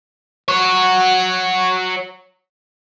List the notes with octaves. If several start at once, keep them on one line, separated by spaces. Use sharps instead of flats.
F#4 C#5